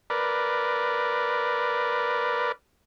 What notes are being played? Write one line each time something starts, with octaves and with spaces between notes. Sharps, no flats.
A#4 B4 D5